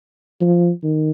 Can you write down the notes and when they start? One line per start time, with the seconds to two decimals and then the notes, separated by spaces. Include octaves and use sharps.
0.41 F3
0.83 D#3